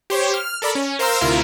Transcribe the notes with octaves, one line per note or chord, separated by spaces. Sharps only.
G4 C5 C#5
F6
A4 A#4 D5 B5
C#4
A#4 C5 F5 A#5 C6 E6
D2 C3 E4 F4 A#4